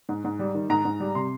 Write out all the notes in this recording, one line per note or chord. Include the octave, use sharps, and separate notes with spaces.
G#2
G#2
G3
D#3
G#2 A#5
G#2
G3
C3 C6